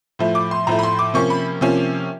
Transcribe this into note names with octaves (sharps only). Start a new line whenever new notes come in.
A2 F3 A3
D6
C6
A2 F3 A3 A#5
B5
C6
D6
C3 F3 A#3 C#4 C#6
B5
C3 F3 A#3 C#4